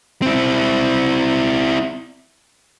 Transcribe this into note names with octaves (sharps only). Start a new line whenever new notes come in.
C4 E4